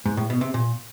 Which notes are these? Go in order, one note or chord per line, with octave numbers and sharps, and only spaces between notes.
G#2
A2
B2
C3
A#2